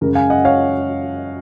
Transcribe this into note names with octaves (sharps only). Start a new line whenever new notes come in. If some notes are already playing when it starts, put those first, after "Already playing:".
F#2 C#3 G#3 A#4
F5 G#5
D#5 F#5
C#5 F5